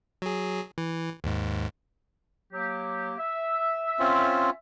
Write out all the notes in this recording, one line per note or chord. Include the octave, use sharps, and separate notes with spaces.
F#3 G#4
E3
D#2 G#2
F#3 A#3 G4
E5
C4 C#4 F4